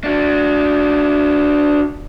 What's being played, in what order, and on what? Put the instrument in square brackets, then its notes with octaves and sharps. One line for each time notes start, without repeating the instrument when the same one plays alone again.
[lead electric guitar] D4 F#4